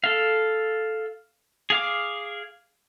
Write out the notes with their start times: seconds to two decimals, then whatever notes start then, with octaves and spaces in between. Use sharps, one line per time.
0.04 A4 F5
1.70 G#4 F5 D6